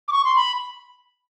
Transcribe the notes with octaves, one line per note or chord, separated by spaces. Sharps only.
D6
C#6
C6
B5